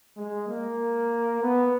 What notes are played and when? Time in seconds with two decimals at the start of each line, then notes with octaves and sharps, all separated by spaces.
0.17 G#3
0.48 A#3
1.42 B3